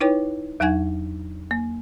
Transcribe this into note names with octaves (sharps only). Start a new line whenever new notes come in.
D#4 E4 B4 C#5 G5
E2 F#3 D#4 F#5 G#5 G#6
A#3